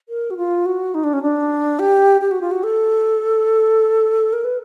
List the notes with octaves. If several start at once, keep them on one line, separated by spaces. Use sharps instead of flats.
A#4
F#4
F4
F#4
D#4
D4
C#4
D4
G4
G4
F#4
F4
F#4
A4
A#4
B4